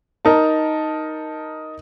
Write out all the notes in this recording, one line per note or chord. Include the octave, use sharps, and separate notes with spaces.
D#4 A#4 A5